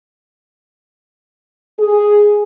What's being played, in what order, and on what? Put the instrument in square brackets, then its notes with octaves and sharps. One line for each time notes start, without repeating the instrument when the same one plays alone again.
[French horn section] G#4